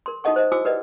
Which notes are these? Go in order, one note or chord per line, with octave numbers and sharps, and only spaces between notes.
A#4 C6
D#4 F#4 A4 D#5 F#5 C#6
C5 D#5
E4 F#4 C5 G#5 D6 E6
G4 A#4 B4 D5 D#5 F#5